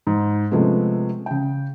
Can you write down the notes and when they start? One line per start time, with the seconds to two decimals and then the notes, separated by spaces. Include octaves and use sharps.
0.07 G#2
0.51 C3 F3 G#3 A3 B3 C#4
1.26 C#3 G5